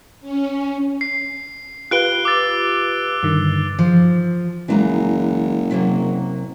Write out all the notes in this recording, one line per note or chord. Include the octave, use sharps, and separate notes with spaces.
C#4
C7
F4 G4 B4 F#6 D7 G7
D6 E6 A6
G2 D3 D#3
F3
F#1 E3 G#3 A#5
C3 F#3 A#3